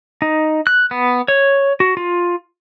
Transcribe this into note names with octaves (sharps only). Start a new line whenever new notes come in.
D#4
F#6
B3
C#5
F#4
F4